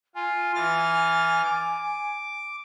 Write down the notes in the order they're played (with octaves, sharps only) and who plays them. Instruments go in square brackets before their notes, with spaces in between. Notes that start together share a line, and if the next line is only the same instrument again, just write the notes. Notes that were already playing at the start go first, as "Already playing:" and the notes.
[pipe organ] F4 [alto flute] G#5
[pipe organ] E3 F6 A6
D6